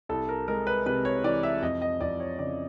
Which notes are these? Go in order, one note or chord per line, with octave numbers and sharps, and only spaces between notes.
C2 A4
A#4
G#3 A#4
B4
C3 B4
C#5
E3 D5
E5
F2 D#5
D#5
F2 D5
C#5
C#3 D5